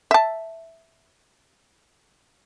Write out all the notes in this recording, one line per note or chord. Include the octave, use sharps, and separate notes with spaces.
E5 A5